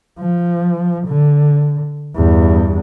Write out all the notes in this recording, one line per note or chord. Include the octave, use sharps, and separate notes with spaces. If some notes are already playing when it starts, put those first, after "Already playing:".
F3
D3
E2 G2